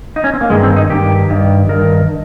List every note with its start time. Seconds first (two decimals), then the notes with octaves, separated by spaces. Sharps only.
0.16 D#4
0.24 C#4
0.34 C4
0.41 A#3
0.50 G2 D#3 G#3
0.63 C4
0.76 D#4
0.90 G2 D#3 G4
1.30 G2 D#3
1.69 G2 D#3 A#4